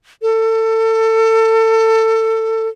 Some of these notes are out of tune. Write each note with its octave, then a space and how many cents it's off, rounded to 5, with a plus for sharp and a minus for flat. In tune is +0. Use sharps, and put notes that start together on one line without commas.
A4 +25